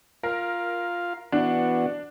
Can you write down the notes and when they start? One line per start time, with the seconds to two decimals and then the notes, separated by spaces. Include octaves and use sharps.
0.23 F4 A#4 F5
1.32 E3 B3 D4 F#4